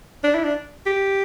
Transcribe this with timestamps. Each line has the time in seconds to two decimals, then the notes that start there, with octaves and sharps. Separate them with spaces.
0.24 D4
0.34 E4
0.44 D4
0.86 G4